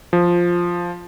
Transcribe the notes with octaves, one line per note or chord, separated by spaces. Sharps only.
F3